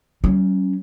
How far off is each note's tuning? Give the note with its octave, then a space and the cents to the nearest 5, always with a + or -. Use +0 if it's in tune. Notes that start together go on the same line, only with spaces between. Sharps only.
F#3 +45 C#4 +0